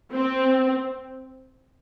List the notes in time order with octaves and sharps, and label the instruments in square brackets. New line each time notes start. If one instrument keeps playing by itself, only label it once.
[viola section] C4